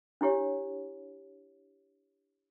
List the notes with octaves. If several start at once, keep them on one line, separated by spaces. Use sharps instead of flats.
D4 E4 G4 C#5